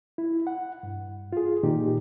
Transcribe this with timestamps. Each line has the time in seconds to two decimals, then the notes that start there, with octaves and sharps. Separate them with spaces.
0.18 E4
0.47 F#5
0.83 G2
1.33 F4 G#4
1.63 A#2 D#3 D#4 G4